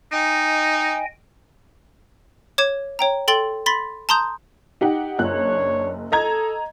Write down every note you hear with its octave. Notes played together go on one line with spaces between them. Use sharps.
D#4 D#5 G5 G#5
C#5 D6 G#6 E7
C#5 G5 A#5
A4 G5 C6 A6 F#7 G7
B5 C6 A6 B6
A5 A#5 C6 D#6 G6
D#4 G4 F#5
F#1 D4 C#5 F#6
A4 D#5 A#5 G#6